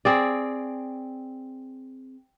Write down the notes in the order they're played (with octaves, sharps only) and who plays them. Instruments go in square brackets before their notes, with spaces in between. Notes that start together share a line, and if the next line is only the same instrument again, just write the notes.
[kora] C4 G#4 D5